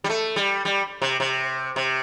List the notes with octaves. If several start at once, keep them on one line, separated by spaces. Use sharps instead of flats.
G3
A3
G3
G3
C3
C3
C3